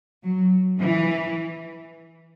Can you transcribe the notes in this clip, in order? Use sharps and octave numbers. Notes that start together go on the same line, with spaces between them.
F#3
E3